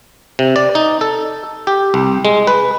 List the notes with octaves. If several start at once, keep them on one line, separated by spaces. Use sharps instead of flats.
C3
D5
D#4
A4
G4
C2
G#3
B4